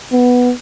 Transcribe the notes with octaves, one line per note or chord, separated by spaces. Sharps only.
B3